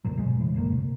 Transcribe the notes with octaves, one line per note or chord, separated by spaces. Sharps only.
D2 G2 A#2 F#3
B2 G#3
G2 C#3 E3
E1 A1 D2 A#3
C3